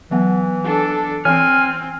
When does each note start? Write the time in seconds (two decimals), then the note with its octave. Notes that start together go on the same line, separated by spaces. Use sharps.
0.11 E3 F#3 B3 F#5
0.65 D4 A4
1.25 E3 C4 G#5 F6